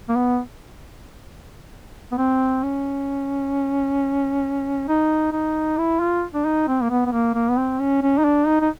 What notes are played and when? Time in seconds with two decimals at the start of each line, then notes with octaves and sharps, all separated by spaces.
0.09 A#3
0.15 B3
2.12 B3
2.18 C4
2.63 C#4
4.88 D#4
5.32 D#4
5.78 E4
6.00 F4
6.34 D4
6.45 D#4
6.68 C4
6.82 A#3
6.90 B3
7.06 B3
7.12 A#3
7.34 A#3
7.50 B3
7.57 C4
7.80 C#4
8.02 C#4
8.18 D#4
8.25 D4
8.47 D#4
8.61 D#4